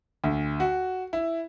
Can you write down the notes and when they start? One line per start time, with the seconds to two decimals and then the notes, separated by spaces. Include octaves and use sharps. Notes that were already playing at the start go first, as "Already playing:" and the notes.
0.24 D2
0.60 F#4
1.13 E4